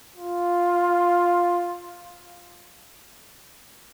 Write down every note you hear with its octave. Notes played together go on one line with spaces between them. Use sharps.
F4